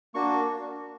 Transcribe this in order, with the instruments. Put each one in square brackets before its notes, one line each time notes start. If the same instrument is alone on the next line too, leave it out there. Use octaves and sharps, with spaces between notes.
[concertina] A#3 D4 F#4 C#6